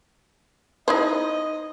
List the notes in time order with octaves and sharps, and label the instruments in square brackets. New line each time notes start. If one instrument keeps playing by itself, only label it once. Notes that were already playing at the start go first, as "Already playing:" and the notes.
[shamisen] D#4 E4 C5 [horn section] D#5